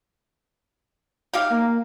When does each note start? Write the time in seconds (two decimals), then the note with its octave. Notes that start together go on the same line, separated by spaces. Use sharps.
1.33 D#4 G4 F5
1.50 A#3